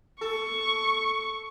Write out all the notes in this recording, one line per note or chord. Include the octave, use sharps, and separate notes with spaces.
A4 C#6